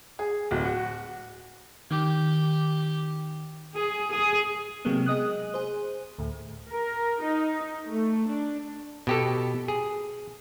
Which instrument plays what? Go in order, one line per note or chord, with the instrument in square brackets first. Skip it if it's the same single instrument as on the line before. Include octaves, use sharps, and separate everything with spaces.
[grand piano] G#4
D1
F#4
[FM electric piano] D#3 [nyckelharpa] G4
[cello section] G#4
G#4
[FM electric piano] C3 F#3 G#3 A#3 B3
G#4 D#5 D#6 F#6
G#4 C5
D2 A2
[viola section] A#4
D#4
A3
D4
[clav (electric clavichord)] B2 G4 A4
G#4